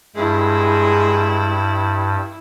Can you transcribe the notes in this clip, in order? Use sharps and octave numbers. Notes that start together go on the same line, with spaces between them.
G2 G#3 E4